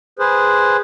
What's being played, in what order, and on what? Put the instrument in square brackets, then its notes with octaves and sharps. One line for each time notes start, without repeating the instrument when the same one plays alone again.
[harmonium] G#4 B4 C5